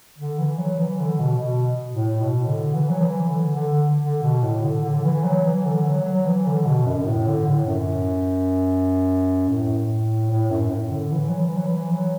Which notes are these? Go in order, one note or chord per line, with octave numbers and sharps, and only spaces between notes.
D3
E3
F#3
E3
D3
B2
B2
A2
B2
D3
E3
F#3
E3
D3
D3
D3
B2
A2
D3
D3
D3
E3
F#3
E3
D3
F#3
F#3
E3
D3
B2
F#2
F#2
A2
D3
A2
F#2
A2
A2
F#2
A2
D3
E3
F#3
E3
F#3
E3
F#3